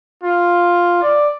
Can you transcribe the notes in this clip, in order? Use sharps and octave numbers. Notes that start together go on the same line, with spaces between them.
F4
D5